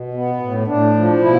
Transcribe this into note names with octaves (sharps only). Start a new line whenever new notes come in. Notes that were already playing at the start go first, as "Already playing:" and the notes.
Already playing: B2
B3
A2
A2 D4
F3
B2 E4